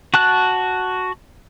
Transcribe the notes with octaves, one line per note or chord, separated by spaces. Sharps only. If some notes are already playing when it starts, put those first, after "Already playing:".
F#4 A5 F#6